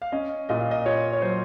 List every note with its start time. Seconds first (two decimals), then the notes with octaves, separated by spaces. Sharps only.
0.02 F5
0.12 C#4 D#5
0.49 A#2 D#5
0.61 F5
0.71 D#5
0.86 F4 C#5
1.13 C#5
1.22 F#3 C5